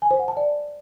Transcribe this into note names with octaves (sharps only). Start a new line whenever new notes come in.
G#5
C5
F#5
A5
D5